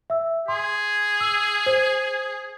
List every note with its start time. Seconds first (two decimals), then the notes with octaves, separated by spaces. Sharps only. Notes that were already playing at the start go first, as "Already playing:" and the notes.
0.10 E5 E6
0.48 G#4 C6
1.21 E6
1.66 C5